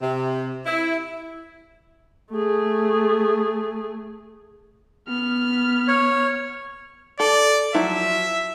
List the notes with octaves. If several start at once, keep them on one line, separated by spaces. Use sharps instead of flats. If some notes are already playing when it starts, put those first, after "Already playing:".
C3
E4
A3 G#4
B3 F6
C#5
A4 D5
F3 F#3 E4 E5